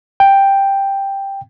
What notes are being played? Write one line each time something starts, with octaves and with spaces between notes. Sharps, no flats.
G5